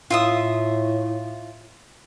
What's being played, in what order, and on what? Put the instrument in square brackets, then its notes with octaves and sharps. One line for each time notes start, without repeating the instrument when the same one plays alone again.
[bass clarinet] A2 [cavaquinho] F4 E5 D#6